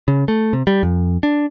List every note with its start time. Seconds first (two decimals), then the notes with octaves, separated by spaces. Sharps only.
0.08 C#3
0.28 A3
0.53 C3
0.67 G3
0.83 F2
1.23 D4